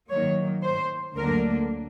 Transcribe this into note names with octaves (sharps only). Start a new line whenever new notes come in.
D#3 F#3 A#3 C#5
C5
D2 D3 F#3 A#3 D4 A#4